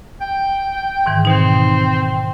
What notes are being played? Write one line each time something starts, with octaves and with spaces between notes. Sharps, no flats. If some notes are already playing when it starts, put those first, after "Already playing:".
G5
G#2 D#3 E3
B2 C4 D#4